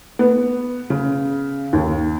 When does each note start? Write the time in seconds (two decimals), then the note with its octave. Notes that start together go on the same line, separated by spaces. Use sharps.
0.19 B3
0.90 C#3
1.73 D#2